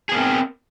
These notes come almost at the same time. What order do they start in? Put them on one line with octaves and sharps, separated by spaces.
G#4 B3 A#4 C4